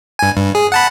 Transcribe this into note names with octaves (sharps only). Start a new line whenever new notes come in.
G2 G#5
G2
G#4
F#5 A5 B5